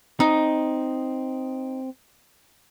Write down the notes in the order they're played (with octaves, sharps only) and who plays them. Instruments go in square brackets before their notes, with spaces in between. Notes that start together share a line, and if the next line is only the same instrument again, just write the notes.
[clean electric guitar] C4 [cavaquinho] D#4